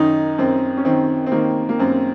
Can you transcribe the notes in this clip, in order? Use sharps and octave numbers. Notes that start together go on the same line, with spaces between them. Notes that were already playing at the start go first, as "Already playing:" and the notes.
Already playing: F#2 D#3 D#4
F#2 C4
C#4
D#3 C4
C4
D#3 A#3
A#3
F#2 C4